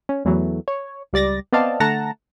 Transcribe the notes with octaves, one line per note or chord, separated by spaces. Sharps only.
C#4
E2 E3 F#3 A3
C#5
C#2 G3 D5 A6 A#6
B3 C4 D5 D#5 F5 A5
D3 A3 F#5 A5 A#5 A#6